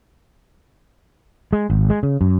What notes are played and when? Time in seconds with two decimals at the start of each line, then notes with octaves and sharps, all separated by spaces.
1.53 G#3
1.70 G#1
1.90 G#3
2.03 C#3
2.21 F#2